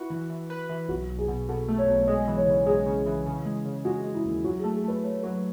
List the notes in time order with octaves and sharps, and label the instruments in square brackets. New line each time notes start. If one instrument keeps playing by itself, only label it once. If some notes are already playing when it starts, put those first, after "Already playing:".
Already playing: [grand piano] E4 [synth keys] F#4 B4
[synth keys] E3
E3
B4
E3
[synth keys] B1 [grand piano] F#4
[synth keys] B1
[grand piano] G#4
[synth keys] B2
[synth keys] B2 [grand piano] A4
[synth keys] A3
[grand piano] C#5
[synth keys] B1
[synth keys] G#3 [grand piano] D#5
[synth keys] E3
[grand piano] C#5
[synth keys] C#3
[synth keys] G#3 [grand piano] G#4
[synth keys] C#3
E3
C#3
G#3
C#3
[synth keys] G#3 [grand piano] F#4
[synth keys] G#3
[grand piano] E4
[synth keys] D#2
[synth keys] F#3 [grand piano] F#4
[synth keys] A3 [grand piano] G#4
[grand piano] G#4
[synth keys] A3 [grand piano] B4
[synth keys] A3 [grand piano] C#5
[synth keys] F#3 [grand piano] B4